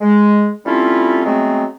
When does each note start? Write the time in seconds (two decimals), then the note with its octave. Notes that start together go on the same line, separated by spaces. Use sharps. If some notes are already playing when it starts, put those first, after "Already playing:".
0.01 G#3
0.66 G3 A3 C4 C#4 E4 F4
1.26 F#3 G#3 A3 B3 C4